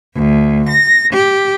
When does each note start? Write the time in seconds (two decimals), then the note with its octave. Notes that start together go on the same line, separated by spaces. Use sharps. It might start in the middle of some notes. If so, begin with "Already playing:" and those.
0.15 D2
0.68 A#6
1.12 G4